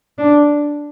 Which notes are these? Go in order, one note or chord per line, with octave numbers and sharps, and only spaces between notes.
D4